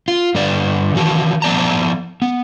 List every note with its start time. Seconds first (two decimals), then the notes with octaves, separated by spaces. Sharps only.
0.08 F4
0.35 G2 D3 B4 D5
0.95 D#3 E3 F#4 A5
1.42 F3 B3 D5 A5 A#5
2.22 B3